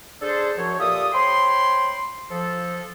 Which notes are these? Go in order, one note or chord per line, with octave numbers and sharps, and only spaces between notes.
D4 G#4 A4 C5
F#2 F3 C#5
A#2 F4 G4 A4 E5 D#6
C5 C#5 G5 B5 C6
F3 A4